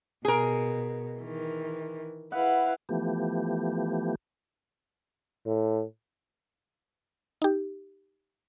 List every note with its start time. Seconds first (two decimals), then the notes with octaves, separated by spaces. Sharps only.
0.25 B2 G#4 A#4
1.18 D#3 E3
2.32 E4 B4 F5 F#5
2.89 E3 F3 A3 B3 G4
5.46 A2
7.42 D#4 G4